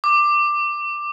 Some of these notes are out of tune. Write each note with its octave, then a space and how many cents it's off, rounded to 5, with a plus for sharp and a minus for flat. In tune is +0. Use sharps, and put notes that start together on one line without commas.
D6 +10